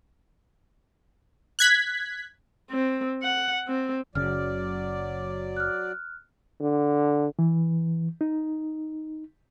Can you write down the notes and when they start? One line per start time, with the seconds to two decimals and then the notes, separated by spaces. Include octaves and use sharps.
1.59 F#6 G#6 B6
2.70 C4
3.23 F#5
3.68 C4
4.15 F#1 C#3 F#3 D5 F6
5.57 F6 F#6
6.60 D3
7.39 E3
8.21 D#4